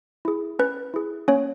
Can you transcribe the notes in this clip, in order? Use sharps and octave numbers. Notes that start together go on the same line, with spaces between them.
E4 G#4
C#4 B4
E4 G#4
A#3 C#4 C#5